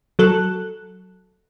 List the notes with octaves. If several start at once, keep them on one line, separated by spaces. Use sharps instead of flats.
F#3 A4 F#6